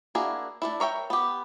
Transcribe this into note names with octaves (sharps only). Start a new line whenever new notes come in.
A#3 D4 E4 F#4 G#4
A3 D4 E4
A#4 C#5 E5 G5
B3 G4